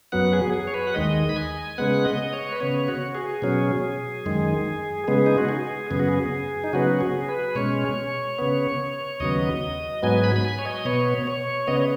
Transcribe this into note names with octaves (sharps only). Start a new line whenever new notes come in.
F#2 F#3 B3 F#5
G#4
G#4
C#5
B4
F#5
D#2 D#3 G#3 D#5
B5
G#5
C#3 G#3 B3 F#5
D#5
C#5
B4
C#3 B3 C#5
F#4
G#4
B2 F#3 C#4
F#2 D#3 G#3
C#3 G#3 B3 G#4
D#4
F#4
G#4
F#2 C#3 B3 G#4
F#4
G#4
D#4
C#3 F#3 B3 F#4
G#4
B4
B2 G#3 C#4 C#5
C#3 B3
D#2 C#3 F#3 B3 D#5
G#2 F#3 B3 G#5
B5
B5
G#5
C#5
D#5
B2 B3 C#5
C#5
C#3 B3 D#5
C#5